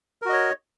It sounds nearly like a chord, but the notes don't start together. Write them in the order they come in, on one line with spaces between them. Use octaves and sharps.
A#4 F#4 D#5 C#5